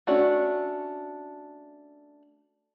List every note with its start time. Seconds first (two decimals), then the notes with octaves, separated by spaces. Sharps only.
0.07 A3 C#4 D4 F#4